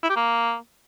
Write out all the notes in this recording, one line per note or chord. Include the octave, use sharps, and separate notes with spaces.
E4
G4
A#3